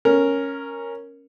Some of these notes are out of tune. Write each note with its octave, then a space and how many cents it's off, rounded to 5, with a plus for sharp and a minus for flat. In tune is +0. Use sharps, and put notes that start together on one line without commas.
C#4 -5 A#4 +0